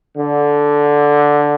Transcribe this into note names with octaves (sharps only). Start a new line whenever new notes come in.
D3